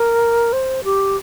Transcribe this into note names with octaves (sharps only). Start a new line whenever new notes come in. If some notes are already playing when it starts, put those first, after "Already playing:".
Already playing: A#4
C5
G4